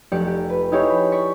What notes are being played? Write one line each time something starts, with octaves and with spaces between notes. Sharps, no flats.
F1 G4 D5 C#7
G4
B4
D#4 E4 G4 G#4 C#5
B5
D5 C#6 B6